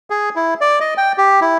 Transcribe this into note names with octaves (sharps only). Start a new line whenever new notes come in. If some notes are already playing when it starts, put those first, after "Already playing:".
G#4
E4
D5
D#5
G5
G4
E4